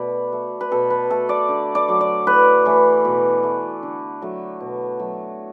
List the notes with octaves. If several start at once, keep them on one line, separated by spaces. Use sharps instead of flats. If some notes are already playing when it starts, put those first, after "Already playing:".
Already playing: B2 A3 B4 D5
A3
B4
B2 A4
B4
A3 A4
D5
D3
D5
F#3 A3
D5
A2 B4
E3 A3
B2
A3
D3
F#3 A3
B2
F#3 A3